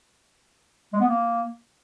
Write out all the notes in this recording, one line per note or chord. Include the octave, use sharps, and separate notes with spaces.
G#3
B3
A#3